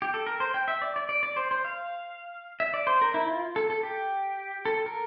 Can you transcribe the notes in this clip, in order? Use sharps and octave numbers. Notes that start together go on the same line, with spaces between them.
G4
A4
A#4
C5
G5
E5
D5
D5
D5
D5
C5
C5
F5
E5
D5
C5
A#4
E4
F4
A4
A4
G4
A4
A#4